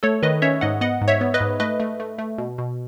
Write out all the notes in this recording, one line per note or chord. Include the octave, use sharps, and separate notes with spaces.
A3 A4 C#5
D#3 B4 D#5
C#4 C#5 E5
G#2 D#5 F#5
B3 D#5 F#5
G#2
C#5 E5
B3
B4 D#5
G#2
A3 B4 D#5
A3
A3
A3
B2
B2